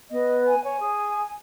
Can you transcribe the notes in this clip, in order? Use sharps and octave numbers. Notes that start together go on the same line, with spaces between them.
B3 D#5
G#5
C#5 G#5
G#4